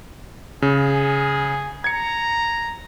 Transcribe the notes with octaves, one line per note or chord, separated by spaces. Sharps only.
C#3 G#4
A#5 G#6 C#7